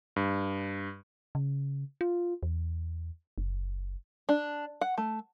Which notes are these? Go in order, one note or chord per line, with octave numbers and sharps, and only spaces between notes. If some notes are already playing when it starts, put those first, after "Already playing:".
G2
C#3
F4
E2
F#1
D4
F#5
A3